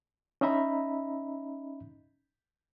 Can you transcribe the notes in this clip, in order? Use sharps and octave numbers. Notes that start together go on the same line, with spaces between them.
C#4 D#4 D#5 E5 A#5 B5